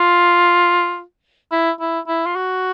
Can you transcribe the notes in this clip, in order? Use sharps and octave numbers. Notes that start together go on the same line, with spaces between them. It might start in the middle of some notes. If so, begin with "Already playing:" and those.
Already playing: F4
E4
E4
E4
F4
F#4